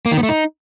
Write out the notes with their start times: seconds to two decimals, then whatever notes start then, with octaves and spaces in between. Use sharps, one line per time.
0.06 A#3
0.11 D#3
0.17 B3
0.23 A3
0.29 D#4